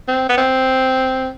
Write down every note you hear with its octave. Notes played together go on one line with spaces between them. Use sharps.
C4
B3
C4